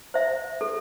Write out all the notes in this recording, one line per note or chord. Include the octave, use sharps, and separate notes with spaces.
C5 E5
A4